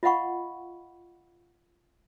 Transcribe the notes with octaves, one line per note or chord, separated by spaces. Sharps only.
F4 D#5 F5 F#5 B5 C#6